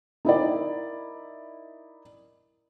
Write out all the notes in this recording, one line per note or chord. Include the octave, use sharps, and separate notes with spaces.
D#4 E4 A#4 D5